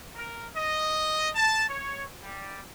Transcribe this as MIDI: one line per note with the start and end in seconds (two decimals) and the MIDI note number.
0.15 0.44 70
0.54 1.27 75
1.33 1.63 81
1.67 2.03 73
2.22 2.58 55